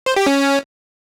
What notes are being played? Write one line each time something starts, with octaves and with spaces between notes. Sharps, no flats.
C5
G4
C#4